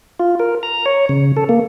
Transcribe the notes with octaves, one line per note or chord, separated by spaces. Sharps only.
F4
A#4
A#5
C#5
C#3
A4
A#3